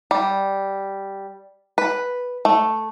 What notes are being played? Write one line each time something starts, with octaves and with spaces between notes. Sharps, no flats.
G3
B4
A3